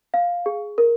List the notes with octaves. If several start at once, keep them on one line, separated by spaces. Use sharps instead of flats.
F5
G#4
A#4